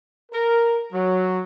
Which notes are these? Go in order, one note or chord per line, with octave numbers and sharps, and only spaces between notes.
A#4
F#3